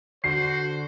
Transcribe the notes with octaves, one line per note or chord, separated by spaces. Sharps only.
D3 F#4 C5 C7